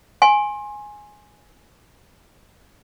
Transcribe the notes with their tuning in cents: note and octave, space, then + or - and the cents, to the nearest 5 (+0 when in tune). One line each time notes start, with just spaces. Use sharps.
G#5 +0 C6 +30